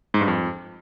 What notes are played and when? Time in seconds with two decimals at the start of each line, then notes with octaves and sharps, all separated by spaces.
0.14 G#2
0.21 G2
0.28 F2